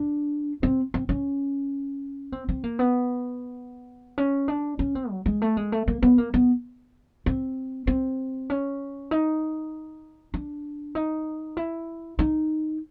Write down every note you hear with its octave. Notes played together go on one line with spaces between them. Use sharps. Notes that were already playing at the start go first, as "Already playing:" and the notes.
Already playing: D4
C4
C4
C#4
C4
C4
A#3
B3
C#4
D4
C#4
C4
F#3
G#3
A3
G#3
A3
A#3
B3
A#3
B3
C4
C4
C#4
D#4
D4
D#4
E4
D#4